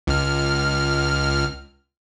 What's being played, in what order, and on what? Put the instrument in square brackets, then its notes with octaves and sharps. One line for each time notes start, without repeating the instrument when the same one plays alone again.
[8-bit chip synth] C#2 F6